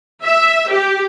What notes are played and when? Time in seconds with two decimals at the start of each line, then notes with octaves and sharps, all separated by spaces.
0.23 E5
0.70 G4